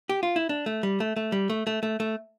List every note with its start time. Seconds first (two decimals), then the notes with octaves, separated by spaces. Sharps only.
0.09 G4
0.23 F4
0.36 E4
0.49 D4
0.66 A3
0.83 G3
1.00 A3
1.16 A3
1.32 G3
1.50 A3
1.67 A3
1.83 A3
2.00 A3